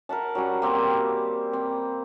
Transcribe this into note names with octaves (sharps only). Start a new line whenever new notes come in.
A#4 E5 F#5 A5
F#3 G3 C#4 F#5
A#3 C4 G4 A#4
C4